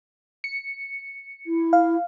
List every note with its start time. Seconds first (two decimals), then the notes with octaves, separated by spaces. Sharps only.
0.44 C#7
1.46 E4
1.73 F5